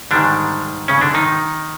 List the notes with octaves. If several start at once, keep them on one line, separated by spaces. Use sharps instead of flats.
G#2 D3 D#3 G3 D4
C#3 C#4
D3 D4
D#3 D#4